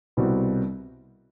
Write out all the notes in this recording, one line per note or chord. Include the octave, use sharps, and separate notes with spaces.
C2 B2 G3 C4 F#4